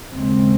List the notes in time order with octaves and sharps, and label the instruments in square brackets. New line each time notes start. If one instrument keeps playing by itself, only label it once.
[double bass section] D#2 C#3 G#3 C4